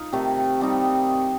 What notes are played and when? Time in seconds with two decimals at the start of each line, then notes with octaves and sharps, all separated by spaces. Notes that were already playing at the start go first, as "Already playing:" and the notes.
Already playing: D#4 F4
0.12 C3 D#3 A3
0.61 G3 C4 D#4